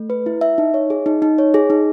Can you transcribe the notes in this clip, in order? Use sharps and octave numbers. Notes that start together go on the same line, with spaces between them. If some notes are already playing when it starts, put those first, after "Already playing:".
Already playing: A3
B4
E4
E5
D#4
C#5
G#4
D#4
D#4
C#5
G#4
D#4